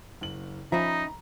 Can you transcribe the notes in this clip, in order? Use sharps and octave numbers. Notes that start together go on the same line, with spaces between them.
F#1 F#7
F3 C#4 D#4 E5 A#5 B5